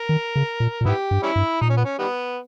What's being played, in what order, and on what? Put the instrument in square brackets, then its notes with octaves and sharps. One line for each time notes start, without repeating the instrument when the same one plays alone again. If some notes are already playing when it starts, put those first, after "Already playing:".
Already playing: [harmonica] A#4
[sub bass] D#3
C#3
A#2
A#2
[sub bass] G#2 [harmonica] B3 E4 G4
[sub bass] G2
[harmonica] G3 C#4 E4
[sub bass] G2
[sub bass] A#2 [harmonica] D#4
[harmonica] C#4
B3
C#4
D#3 G3 B3